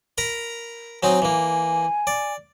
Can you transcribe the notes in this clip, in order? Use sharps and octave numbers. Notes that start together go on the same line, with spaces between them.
A#4 A#5 B5
F#3 C4 D#4 G#5
E3 A#3
D5